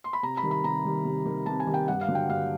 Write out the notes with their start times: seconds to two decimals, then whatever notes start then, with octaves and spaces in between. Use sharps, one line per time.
0.04 C6
0.13 B5
0.23 C3 A#5
0.37 B5
0.43 D#3 G3
0.51 B5
0.64 C3 A#5
0.85 D#3 G3
1.05 C3
1.25 D#3 G3
1.46 C3 A5
1.60 G#5
1.67 D#3 G3
1.74 G5
1.88 G2 F#5
2.01 F5
2.08 D3 F#3
2.15 G5
2.30 G2 F5